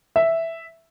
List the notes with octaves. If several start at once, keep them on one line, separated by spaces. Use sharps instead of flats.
E5